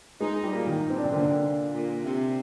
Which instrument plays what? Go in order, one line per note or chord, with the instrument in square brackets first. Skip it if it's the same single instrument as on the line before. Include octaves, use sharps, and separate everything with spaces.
[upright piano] G#3 G#4 [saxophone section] D#4
[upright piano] G3 G4
[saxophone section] A#2
[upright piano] D#3 D#4
[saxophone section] A#2
[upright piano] C4
D4
C3 C4
[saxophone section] A#2 [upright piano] D3 D4
[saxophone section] A#2
A#2
C3